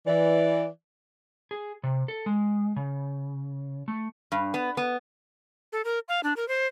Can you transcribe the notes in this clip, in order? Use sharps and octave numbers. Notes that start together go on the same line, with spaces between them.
E3 D5
G#4
C3
A4
G#3
C#3
A3
G2
B3
B3
A4
A#4
F5
D4
A#4
C5